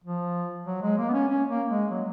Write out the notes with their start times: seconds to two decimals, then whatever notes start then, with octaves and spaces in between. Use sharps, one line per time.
0.04 F3
0.67 F#3
0.82 G#3
0.98 A#3
1.09 B3
1.13 C#4
1.29 C#4
1.49 A#3
1.70 G#3
1.90 F#3